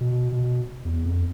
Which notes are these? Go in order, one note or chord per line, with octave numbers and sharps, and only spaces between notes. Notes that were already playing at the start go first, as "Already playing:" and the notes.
B2
B2
E2
F2